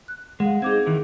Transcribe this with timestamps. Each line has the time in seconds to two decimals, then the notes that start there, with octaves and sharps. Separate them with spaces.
0.08 F#6
0.40 G#3 F5 F#5
0.62 C4 D#4 G#4 D6 G#6
0.86 D#3 E3 E4